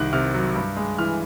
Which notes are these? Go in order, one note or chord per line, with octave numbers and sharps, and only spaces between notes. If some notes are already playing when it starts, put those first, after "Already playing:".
Already playing: C2 D#3 F#6
C3 F6
F#3
G2
G#3
E3 F6